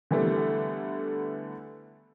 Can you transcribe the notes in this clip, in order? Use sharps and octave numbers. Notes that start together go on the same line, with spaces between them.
D3 E3 G3 A3 B3